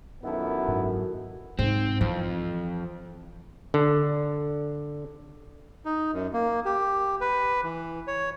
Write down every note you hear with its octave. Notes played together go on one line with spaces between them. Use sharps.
F#2 D#3 B3 E4 F#4 A4
F#1 G#2 F#3
G#2 C4
F2 E3
D3
D#4
F#2
A#3
G4
B4
E3
C#5